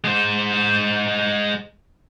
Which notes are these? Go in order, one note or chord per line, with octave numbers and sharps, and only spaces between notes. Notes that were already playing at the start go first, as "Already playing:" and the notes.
G#3 C5